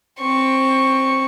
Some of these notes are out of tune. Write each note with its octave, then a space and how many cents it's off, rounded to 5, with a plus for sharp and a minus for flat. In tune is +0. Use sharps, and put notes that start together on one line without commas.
C4 +15 C#6 +0